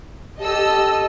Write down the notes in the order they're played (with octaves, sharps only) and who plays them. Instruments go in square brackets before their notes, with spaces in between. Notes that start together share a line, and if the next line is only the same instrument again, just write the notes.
[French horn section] G4 [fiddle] A4 [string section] D#5 E6